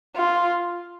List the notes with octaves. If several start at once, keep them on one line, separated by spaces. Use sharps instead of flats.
F4